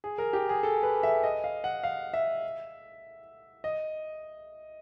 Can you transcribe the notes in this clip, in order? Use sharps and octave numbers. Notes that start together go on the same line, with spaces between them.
G#4
A#4
G4
G#4
A4
B4
E5
D#5
F5
F#5
F5
E5
D#5